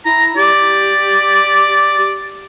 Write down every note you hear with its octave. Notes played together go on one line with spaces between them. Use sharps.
E4 A#5
G4 D5